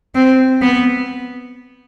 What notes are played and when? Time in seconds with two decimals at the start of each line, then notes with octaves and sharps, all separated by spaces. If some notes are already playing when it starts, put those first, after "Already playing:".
0.15 C4
0.62 B3